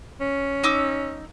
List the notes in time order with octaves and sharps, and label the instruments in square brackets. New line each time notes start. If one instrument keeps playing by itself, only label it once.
[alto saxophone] C#4
[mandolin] D#4 D6 E6